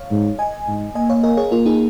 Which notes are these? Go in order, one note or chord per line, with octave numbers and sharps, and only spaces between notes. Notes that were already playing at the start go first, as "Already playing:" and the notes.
Already playing: C#5 F5
G#2
D#5 G#5
G#2
A#3 D#5 G#5
C#5 F5
A#4 D#5
G#4 C#5
A#3 F4 A#4
D#4 G#4